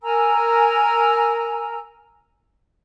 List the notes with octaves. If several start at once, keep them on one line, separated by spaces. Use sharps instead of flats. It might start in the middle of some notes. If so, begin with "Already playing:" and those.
A#4 G#5 A#5 E6